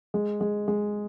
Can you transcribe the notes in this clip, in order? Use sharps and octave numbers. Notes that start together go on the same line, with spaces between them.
G#3
G#3
G#3